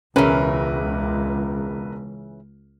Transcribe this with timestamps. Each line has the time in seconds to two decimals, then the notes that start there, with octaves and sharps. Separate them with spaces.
0.16 E1 C#2 C#3 E3 C#4 A#4 B4